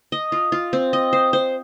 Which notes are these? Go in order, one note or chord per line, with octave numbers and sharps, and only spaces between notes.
D#5
F4
F4
C4
D#5
C5
C5